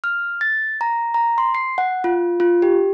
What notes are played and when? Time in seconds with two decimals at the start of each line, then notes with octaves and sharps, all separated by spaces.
0.04 F6
0.41 A6
0.81 A#5
1.14 A#5
1.38 C6
1.55 C7
1.78 F#5
2.04 F4
2.40 F4
2.62 G4